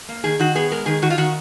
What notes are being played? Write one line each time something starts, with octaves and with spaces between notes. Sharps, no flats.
A#3
D#3 G#4
D#3 F#4
B3 G#4
G#3 A#4
D#3 G#4
D#3 F#4
F4
D#3 F#4